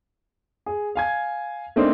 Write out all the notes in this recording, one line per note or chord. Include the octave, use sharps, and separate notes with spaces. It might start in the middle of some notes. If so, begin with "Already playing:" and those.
G#4
F5 G#5 G#6
A3 A#3 C4 D4 D#4